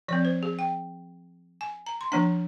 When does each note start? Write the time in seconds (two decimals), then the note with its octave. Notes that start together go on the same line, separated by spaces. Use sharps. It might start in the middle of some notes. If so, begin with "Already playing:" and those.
0.08 F3 C4 D5
0.25 C5
0.43 G#4
0.59 G5
1.61 G#5
1.86 A#5
2.01 C6
2.12 F3 A#3 D4 A#5